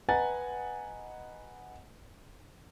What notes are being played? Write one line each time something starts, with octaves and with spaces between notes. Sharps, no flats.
B4 D#5 F#5 G#5 A#5 A6